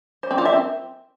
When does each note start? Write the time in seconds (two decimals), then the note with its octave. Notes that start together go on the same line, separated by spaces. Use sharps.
0.23 C5
0.31 C4
0.38 F4
0.45 E5
0.53 C4